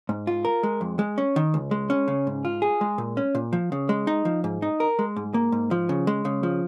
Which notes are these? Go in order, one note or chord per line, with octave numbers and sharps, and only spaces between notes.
G#2
F4
A#4
G#3
F2
G#3
C#4
D#3
C#2
G#3
C#4
C#3
G#2
F4
G#4
G#3
A#2
C#4
A#2
F3
C#3
G#3
D#4
F3
G#2
D#4
A#4
G#3
G#2
A#3
G#2
F3
C#3
G#3
C#3
F3